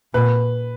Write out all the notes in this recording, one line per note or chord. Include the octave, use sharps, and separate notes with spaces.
A#2 B4